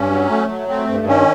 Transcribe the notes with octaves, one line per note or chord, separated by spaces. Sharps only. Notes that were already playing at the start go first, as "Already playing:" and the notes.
Already playing: G2 C#4
F#3
A3
F#3
A3 C4
G2
D#3 C#4